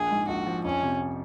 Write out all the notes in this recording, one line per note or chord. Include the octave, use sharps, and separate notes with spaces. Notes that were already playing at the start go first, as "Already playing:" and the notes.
Already playing: A#1 G#4
G#2
A#1 F#4
F3
F2 C#4
C3